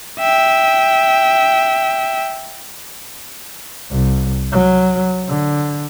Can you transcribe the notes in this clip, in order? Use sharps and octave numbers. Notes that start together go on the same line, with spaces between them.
E5 G5
C2
F#3
D3